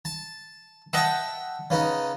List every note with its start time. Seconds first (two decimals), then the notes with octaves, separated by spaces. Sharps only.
0.05 A5
0.93 D#5 E5 F#5 G5 A5
1.70 C#3 B3 D#4